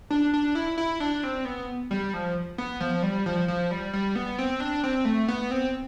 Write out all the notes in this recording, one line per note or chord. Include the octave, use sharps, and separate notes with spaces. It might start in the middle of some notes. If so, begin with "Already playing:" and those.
D4
D4
E4
E4
D4
C4
B3
G3
F3
B3
F3
G3
F3
F3
G3
G3
B3
C4
D4
C4
A3
B3
C4